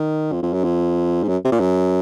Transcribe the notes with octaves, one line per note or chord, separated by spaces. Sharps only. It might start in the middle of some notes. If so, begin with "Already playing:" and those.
Already playing: D#3
F2
F2
F#2
F2
G#2
F#2
C3
A#2
F#2